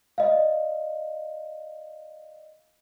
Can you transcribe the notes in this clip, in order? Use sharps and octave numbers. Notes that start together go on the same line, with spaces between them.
D5 D#5 F5